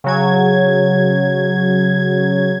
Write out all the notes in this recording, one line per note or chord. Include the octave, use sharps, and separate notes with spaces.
C#3 F#3 G#6